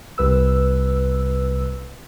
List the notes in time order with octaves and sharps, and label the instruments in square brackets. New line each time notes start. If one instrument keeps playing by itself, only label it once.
[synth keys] C2 B4 E6